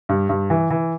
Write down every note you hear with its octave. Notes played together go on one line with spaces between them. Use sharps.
G2
G2
E3
E3